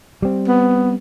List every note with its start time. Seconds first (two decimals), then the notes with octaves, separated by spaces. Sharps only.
0.22 G3 C4
0.48 B3